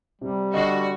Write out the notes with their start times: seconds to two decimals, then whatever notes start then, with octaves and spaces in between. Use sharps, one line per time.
0.21 C3 G3
0.54 D3 F#4 D#5 C7